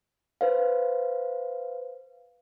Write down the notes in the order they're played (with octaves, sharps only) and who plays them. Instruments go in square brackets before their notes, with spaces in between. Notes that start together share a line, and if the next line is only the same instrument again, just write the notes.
[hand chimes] B4 C5 F5